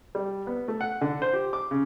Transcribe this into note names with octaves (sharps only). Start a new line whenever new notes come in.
G3
B3
A3
F#5
D3
C5
G4
D6
C#3